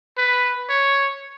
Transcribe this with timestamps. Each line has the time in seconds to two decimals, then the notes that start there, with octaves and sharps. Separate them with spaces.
0.17 B4
0.69 C#5